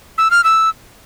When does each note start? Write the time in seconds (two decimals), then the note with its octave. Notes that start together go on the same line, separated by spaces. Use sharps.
0.18 E6
0.31 F6
0.44 E6